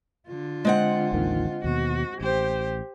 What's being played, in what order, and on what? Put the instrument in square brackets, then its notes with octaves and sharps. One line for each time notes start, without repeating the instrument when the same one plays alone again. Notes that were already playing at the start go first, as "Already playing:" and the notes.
[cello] D3 F4
[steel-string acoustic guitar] G#3 C4 F#5
[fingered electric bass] A1 D#2 D#3
[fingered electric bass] D#2 B2 [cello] F#4
[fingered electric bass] A1 [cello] G4 C5